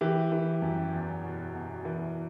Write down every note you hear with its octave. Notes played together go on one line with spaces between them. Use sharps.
E3 G4
E3
F#2
E2
B2
B2
E3